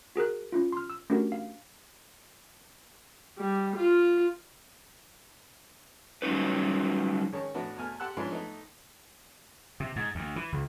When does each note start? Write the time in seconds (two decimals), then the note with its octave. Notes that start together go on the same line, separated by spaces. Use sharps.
0.16 F#4 G#4 A#4 F#6
0.52 C#4 E4 F4
0.72 C6 F6
0.90 E6
1.10 A3 C#4 D4 F#4 G4 A#4
1.32 F5
3.38 G3
3.76 F4
6.22 F#3 G3 C#4 D#4 B4
7.32 D#3 G#3 C#4 C#5 A5
7.55 A2 E3 A3 B3 D4 F#4
7.77 E2 B2 A3 G#5 F6
8.00 G4 F#5 A5 C6 E6 F#6
8.17 G#2 E3 F3 C#4 D4
8.31 A3 B3 D#4
9.80 C3
9.96 G#2
10.15 D2
10.36 E3
10.52 C#2